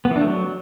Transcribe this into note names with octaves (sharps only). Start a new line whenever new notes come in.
B3
E3
D4
A3
F#3